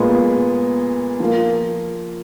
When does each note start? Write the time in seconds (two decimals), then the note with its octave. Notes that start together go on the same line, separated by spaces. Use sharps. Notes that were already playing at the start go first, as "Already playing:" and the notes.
Already playing: A#2 G#3 B3 F4
1.20 F3 A#3 F4